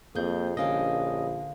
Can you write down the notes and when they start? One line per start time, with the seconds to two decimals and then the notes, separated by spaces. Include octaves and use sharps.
0.15 F2 A#3 G#4 G6
0.57 A#1 D3 C#4 G4 D#5 F5 G5